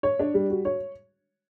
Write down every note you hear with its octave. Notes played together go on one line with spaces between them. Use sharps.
C#5
D4
G3
F#4
C#5